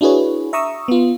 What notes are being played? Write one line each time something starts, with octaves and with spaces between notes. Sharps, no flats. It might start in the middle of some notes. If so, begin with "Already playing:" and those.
D4 E4 F#4 G#4 B4 C#5
E5 A#5 C#6 D#6 E6
B3 F4